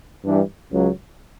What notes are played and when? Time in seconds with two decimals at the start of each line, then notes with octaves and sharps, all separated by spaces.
0.25 G2 E3 G3 D4
0.72 C#2 C#3 F#3